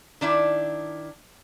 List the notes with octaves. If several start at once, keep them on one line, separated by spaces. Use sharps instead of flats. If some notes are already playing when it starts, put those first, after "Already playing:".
D#3 D4 E4